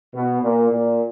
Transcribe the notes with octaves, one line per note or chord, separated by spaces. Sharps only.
B2
A#2
A#2